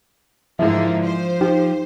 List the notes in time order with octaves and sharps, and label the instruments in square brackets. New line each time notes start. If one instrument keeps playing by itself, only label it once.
[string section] G#2 D3 A#3 [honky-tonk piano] E3 G#3 E4 [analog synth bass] F3 [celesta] E5
[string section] C5
[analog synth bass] F3 [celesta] D#4 [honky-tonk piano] G4